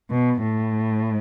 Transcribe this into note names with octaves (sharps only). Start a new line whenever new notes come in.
B2
A2